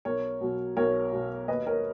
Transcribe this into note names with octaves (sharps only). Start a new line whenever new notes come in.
B1 A#4 C#5
B2 F#3
B1 A#4 C#5
B2 F#3
D#2 B4 D#5
A#4 C#5